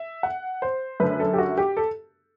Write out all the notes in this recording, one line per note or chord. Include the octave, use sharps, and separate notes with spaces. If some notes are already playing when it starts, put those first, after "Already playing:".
Already playing: E5
F#5
C5
F#2 D3 A3 B4
A4
G4
F#4
G4
A4